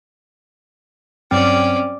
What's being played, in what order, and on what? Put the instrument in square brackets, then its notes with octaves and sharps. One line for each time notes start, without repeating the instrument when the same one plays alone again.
[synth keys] G2 F#3 [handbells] C4 [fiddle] C#4 D5